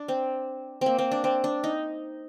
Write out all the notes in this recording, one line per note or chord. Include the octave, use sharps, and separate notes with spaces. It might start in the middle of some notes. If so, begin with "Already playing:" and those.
Already playing: D4
C4
A#3 C4
C4
D4
C4
D4
D#4